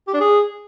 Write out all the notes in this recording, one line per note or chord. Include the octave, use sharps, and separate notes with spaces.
G4
D4
G#4